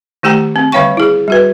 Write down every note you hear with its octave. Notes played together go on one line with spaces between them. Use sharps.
D#3 A3 G4 G5 A#5
C4
D3 G3 C#5 F5 G5 C#6
E4 G#4
G3 F#4 B4